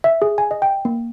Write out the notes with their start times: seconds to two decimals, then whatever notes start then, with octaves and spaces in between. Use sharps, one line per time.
0.04 E5
0.22 G#4
0.38 G#5
0.51 D#5
0.62 G5
0.85 A#3